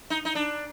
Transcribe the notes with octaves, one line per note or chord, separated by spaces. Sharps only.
D#4
D#4
D4